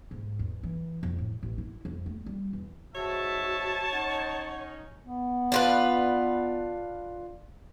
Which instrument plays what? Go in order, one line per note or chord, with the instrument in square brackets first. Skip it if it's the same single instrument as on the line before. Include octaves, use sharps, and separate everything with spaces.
[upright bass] G#2
E2
E3
F2
A2
A1
E4
F2
A3
G3
E2
[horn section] G#2 E5 [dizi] F#4 [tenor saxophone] C#5 [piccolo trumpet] A5
[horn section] C#4 D#4 [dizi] F#5
[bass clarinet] B3
[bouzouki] D4 F4 B4